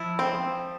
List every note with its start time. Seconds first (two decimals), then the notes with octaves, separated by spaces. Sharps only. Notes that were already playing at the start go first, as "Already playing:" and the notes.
Already playing: F3 E4
0.19 C4